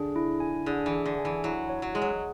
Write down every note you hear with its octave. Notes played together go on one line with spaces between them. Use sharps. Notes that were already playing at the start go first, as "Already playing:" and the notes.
Already playing: D3 G#4
E4
G#5
D3 G#4
E3
G#4
D3
G#5
E3
F#3 E4
C#5
F#3
G#3 G#4
F#3